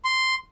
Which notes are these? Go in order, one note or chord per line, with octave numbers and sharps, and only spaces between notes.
C6